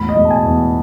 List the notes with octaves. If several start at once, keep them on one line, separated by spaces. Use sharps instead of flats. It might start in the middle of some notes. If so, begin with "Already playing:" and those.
Already playing: E1 A2 B5
D#5
E1
A5
G#5
E2